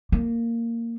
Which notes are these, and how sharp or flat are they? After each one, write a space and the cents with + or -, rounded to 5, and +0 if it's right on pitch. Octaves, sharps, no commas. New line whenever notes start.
A#3 -10